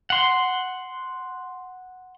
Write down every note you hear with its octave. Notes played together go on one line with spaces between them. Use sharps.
F#5 C6